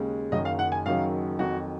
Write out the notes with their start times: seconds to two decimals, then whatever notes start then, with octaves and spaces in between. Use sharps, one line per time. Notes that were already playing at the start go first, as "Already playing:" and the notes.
Already playing: D#2 C#3 G#3
0.32 F#1 F#2 D#3 F#3 D#5
0.45 F5
0.59 F#5
0.72 G#5
0.86 F#1 F#2 D#3 F#3 F5
1.39 F2 D#3 F#3 F#4